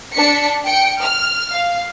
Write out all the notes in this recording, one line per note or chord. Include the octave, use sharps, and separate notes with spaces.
D4 B6 C#7
G5 C#7 D7
F6
F5